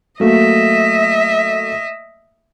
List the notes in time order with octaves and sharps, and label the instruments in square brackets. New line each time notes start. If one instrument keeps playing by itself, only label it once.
[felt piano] F#3 A3 A#3 [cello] D#5 E5